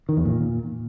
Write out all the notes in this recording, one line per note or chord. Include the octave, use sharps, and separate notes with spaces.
D#3
E2
A#2